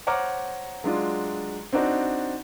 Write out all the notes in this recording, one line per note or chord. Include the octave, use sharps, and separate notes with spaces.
C5 C#5 F#5 A#5 D6 F6
F#3 G#3 D4 F4
C4 D4 D#4 F#4